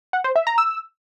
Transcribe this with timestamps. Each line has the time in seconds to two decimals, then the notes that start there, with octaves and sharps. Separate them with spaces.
0.13 F#5
0.24 C5
0.36 E5
0.47 A#5
0.58 E6